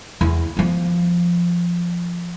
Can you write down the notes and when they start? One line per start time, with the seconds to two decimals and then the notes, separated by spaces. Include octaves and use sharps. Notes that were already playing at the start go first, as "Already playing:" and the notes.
0.21 E2
0.57 F3 B3